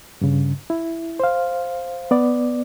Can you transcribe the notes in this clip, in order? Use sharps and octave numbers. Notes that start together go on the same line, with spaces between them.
G2 C#3
E4
C5 F5
B3 D5